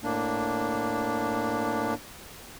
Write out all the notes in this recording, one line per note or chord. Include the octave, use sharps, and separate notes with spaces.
A2 A#3 D4